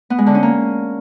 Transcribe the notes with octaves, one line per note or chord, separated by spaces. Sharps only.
B3
G#3
D3
C#4
A#3